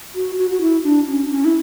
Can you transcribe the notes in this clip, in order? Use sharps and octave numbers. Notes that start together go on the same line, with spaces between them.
F#4
F#4
F#4
E4
D4
C#4
C#4
E4